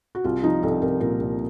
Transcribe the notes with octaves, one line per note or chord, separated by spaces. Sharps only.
F#4
C2 F4
F3 D#4
C2 A4
C2 A#4
A#2 A#4
C2